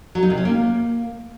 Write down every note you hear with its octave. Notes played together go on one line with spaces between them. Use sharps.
F#3
D#4
C3
C#4
A#3